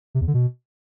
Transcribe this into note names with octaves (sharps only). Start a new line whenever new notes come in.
C3
E2
D3
B2